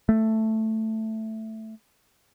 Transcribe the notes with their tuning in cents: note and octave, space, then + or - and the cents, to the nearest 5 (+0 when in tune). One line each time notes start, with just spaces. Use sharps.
A3 +5